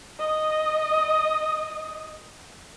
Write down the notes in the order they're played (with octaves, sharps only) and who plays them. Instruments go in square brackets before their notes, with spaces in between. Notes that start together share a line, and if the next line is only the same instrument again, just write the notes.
[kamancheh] D#5 D#6